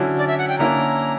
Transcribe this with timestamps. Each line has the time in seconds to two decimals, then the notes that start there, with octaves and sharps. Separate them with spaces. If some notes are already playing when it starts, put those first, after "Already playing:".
Already playing: D3 F#3 C#4 E4
0.18 D5
0.28 E5
0.38 F#5
0.48 G5
0.58 D3 A#3 C#4 E4 A#5